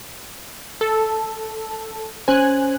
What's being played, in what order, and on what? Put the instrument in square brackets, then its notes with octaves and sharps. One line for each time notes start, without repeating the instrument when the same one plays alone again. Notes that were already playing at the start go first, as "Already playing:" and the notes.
[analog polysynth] A4
[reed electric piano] C#4 C5 [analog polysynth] G#5 F#6